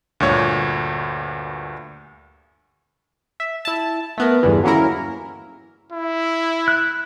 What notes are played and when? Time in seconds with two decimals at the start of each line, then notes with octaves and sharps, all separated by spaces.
0.20 D2 G2 A#2 C#5
3.40 E5
3.65 E4 A5
4.18 A3 B3 A#4
4.43 E2 G2 D3 E3
4.64 F#3 A#3 C#4 E4 A#4
5.92 E4
6.68 F#6